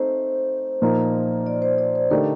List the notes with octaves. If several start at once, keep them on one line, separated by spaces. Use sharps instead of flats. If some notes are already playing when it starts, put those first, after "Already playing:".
Already playing: A3 C4 D#4 C5
A#2 F3 A#3 D#4
D5
C5
D5
C5
D3 A3 D#4 G4 A#4 D5